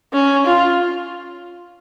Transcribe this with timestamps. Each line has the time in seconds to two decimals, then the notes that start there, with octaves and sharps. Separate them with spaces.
0.14 C#4
0.47 F4